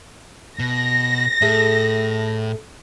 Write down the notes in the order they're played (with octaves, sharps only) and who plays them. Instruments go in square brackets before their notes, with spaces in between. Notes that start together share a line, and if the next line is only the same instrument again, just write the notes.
[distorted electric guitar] B2 [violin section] A#6
[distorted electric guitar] A2 [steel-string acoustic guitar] G#4 A4 E5